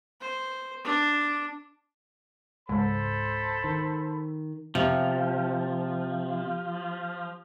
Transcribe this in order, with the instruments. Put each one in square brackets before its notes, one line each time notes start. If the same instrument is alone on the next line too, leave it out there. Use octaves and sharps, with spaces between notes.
[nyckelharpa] C5
D4
[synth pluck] C#2 G#2 [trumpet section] A4 C5 B5
[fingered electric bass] D#3
[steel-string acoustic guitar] C3 [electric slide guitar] F3